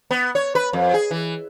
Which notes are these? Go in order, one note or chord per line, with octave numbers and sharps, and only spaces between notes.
B3
C#5
B4
F2
G#4
E3